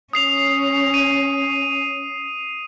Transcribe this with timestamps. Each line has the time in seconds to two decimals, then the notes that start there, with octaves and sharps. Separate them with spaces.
0.13 C#4 D#6 C7 F7
0.94 D#7